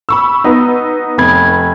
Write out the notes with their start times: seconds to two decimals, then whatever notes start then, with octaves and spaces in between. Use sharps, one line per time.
0.09 B5 C#6 E6
0.44 B3 D#4
1.18 F1 B5 G#6